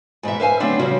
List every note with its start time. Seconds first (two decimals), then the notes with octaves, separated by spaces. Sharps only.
0.23 G#2 B2 E3 E5
0.40 B4 C5 E5 F5 G5 G#5
0.60 D3 F#3 A3 B3 C4 D4
0.79 C#3 F3 G3 F#4